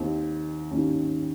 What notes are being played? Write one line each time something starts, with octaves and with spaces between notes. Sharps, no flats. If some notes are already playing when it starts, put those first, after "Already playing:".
Already playing: D#2 D#3 C4
D#2 D#3 C#4